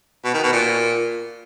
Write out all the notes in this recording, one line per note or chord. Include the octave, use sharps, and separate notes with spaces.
B2
D#3
B2
A#2